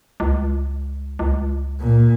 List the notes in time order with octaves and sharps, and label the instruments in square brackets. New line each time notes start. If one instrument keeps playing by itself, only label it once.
[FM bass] C#2
C#2
[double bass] A#2